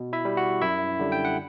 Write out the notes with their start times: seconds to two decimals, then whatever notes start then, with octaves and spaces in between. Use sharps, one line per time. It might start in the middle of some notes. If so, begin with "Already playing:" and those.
Already playing: B2
0.13 E4 E5
0.25 G3
0.37 F#4 F#5
0.62 F#2 E4 E5
0.99 D3 G3
1.12 G5
1.25 F#5